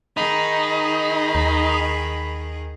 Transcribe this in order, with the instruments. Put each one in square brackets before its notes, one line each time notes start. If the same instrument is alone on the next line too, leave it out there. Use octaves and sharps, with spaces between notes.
[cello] D#3 G#4 [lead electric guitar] D#4 [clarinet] B5
[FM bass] D#2